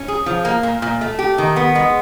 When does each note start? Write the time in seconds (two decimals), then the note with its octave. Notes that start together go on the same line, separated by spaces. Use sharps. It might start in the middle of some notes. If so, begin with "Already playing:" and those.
Already playing: C#4
0.08 G#4
0.26 F3
0.45 A#3
0.63 A#2
0.82 A#2
1.01 A3
1.19 G4
1.38 D#3
1.56 B3
1.75 G#3